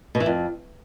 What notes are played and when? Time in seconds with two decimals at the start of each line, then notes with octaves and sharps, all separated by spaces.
0.15 B2
0.20 E3
0.26 F2